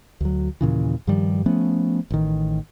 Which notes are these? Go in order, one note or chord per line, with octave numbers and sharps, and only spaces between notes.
D2 F#3
D#2 A#2 C#3 E3
G2 D#3 F3 G3
F3 A3 B3 C#4
A1 D#3